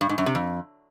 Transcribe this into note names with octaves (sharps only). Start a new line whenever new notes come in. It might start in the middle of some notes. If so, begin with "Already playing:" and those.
G2
G#2
F#2
C3
F2